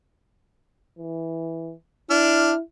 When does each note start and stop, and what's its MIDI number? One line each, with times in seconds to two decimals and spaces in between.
0.99 1.73 52
2.10 2.52 62
2.10 2.61 64
2.10 2.52 89